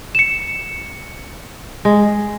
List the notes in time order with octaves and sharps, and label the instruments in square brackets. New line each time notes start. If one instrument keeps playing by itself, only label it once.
[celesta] C#7 E7
[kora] G#3